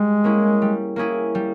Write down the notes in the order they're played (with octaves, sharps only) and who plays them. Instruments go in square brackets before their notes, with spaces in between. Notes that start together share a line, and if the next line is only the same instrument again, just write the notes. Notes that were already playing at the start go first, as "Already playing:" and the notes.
Already playing: [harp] G3 [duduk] G#3
[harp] A#3 C#4 E4 G#4
G3
A#3 C#4 E4 G#4
G3